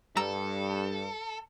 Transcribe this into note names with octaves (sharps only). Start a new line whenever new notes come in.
G2 G3 A4 A#5 E6